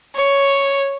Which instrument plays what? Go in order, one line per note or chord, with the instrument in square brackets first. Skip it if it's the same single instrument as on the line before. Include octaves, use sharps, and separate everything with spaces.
[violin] C#5